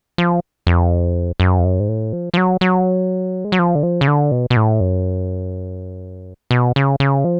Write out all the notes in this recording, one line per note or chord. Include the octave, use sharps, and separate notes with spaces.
F3
F2
F#2
F2
F#2
G#2
A2
F3
F3
F#3
F#3
G#3
F#3
F3
D3
F3
C#3
D3
B2
B2
A2
F#2
B2
C#3
C#3
F3